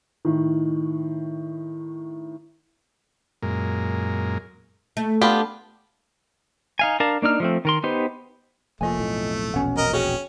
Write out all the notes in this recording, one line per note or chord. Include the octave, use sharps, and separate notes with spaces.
A2 D#3
F#2 A#2 G#3 A#4
A3
B3 D4 F4 G4
D#4 F5 G#5
D4 A#4 F5 A5
A#3 D4 D#4 F6
F3 A3 C4
D#3 A#4 C6
B3 D#4 G4 B4 C5
F1 F2 A3 A#3 F4 D#5 G#5
B1 F2 A2
E1 A#1 B2 C#4 F#5
A#4 D#5
C#4 F#4 G#4 G5